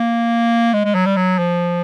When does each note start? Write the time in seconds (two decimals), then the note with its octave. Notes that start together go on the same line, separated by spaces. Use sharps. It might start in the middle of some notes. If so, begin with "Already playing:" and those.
Already playing: A#3
0.73 G#3
0.85 G#3
0.95 F#3
1.06 G3
1.16 F#3
1.38 F3